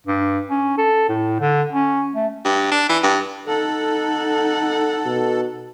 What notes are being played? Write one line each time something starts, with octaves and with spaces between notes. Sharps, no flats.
G2
C#4
A4
A2
D3
C#4
A3
G2
D4
E3
G2
D#4 A4 F#5
B2